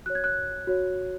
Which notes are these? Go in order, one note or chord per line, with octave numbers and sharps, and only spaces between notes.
F#4 C#5 F#6
G#6
F#6
F#4 C#5